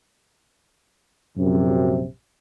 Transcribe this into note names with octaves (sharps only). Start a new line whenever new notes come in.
A#1 F#2 C3